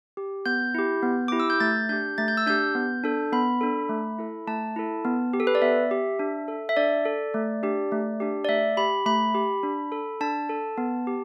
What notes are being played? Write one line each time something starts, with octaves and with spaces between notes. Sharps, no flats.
G4
B3 G6
E4 G4
B3
E4 G4 D6
E6
G6
A3 A6
D4 G4 G6
A3 A6
G6
E6
D4 G4 G6
B3
D4 A4
B3 B5
D4 A4
A3
E4 A4
A3 A5
E4 A4
B3
G4
A4
B4
D5
B3 E5
G4
D4
A4
E5
D4 D5
A4
A3
D4 G4
A3
D4 G4
D5
A3 E5
G4 B5
A3 B5
G4
D4
A4
D4 A5
A4
B3
G4